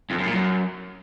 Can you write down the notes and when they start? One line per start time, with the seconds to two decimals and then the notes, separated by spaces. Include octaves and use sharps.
0.10 F2
0.18 F#2
0.26 A#2
0.34 F#2